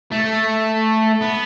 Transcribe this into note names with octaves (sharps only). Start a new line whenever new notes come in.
A3
B3